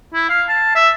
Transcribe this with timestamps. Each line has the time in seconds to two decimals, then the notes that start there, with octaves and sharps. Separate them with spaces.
0.14 E4
0.29 F5
0.49 A5
0.75 E5